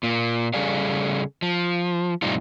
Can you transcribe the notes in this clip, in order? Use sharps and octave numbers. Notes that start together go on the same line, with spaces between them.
A#2 A#3
C#3 G3 G#4 A4 D5 F5
F3
F2 A2 C3 G3 D#4 F4